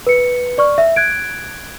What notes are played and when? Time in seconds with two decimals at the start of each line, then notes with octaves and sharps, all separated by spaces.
0.07 B4 C#7
0.58 D5 C#6 F6
0.78 E5
0.96 F#6 G#6 D7